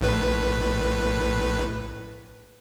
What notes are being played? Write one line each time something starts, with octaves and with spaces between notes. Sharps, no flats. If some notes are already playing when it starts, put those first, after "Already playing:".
A#1 A2 B4